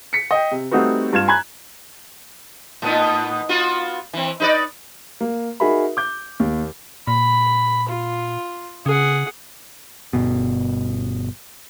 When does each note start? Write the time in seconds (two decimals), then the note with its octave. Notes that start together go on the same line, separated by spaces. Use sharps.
0.13 B6 C#7
0.31 D#5 G5
0.51 C3
0.71 G3 A3 C4 D#4 F#4 B4
1.13 G2 F4 G#6 E7
1.28 G#5 A#5 B5 F#6 G#6
2.82 A2 B3 D#4
3.49 B3 F4 F#4
4.13 E3 C4
4.40 D#4 B4 D5
5.21 A#3
5.60 D#4 F#4 G#4 A#4 E5 B5
5.97 D6 G6
6.40 D#2
7.07 A#2 B5
7.88 F4
8.86 C#3 G#4 F#5
10.13 G1 B2